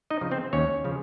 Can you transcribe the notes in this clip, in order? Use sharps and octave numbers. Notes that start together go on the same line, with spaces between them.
D#4 D#5
C#3 F3
C4 C5
D#2 C#4 C#5
C#3 F3